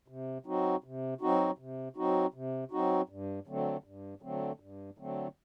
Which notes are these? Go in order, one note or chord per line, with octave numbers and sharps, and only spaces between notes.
C3
F#3 C4 D#4 F#4
C3
F#3 C4 D#4 F#4
C3
F#3 C4 D#4 F#4
C3
F#3 C4 D#4 F#4
G2
D3 F#3 A3 C4
G2
D3 F#3 A3 C4
G2
D3 F#3 A3 C4